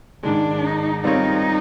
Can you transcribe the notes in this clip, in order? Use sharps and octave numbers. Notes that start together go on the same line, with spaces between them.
G#2 D#3 G#3 D4
D#4
G3 C4 D#4 F4 A#4 C#5